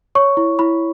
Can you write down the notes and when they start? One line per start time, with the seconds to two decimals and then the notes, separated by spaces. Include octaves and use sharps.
0.15 C#5 C#6
0.37 E4
0.59 E4 B5